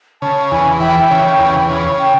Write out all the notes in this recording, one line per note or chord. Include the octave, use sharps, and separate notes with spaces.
C#3 A5
E2 G#5
E3 G5
C#3
E2
C#3
G5